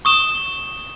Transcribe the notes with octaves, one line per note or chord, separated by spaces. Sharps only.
C#6 D#6 E7 G7